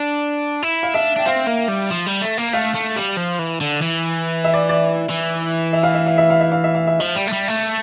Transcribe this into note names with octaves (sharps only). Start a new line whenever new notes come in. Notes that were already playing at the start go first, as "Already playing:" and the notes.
Already playing: D4
E4
F5
D4 E5
D4 G5
C4 F5
A#3
G3
F3
G3
A3
A#3
A3 F5
A3
G3
F3
E3
D3
E3
E5
D5
D5
E3
E5
F5
E5
F5
E5
F5
E5
F5
E5
F5
E5
F3 E5
G3
A3
G3
A3